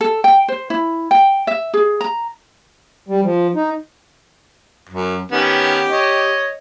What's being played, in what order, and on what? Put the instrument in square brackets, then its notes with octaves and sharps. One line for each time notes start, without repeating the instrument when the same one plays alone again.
[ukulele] A4
G5
C5
E4
G5
E5
G#4
A#5
[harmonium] G3
F3
D#4
[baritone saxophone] F#2
[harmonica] D#3 B3 C#4 [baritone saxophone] G4
[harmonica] C#5 D#5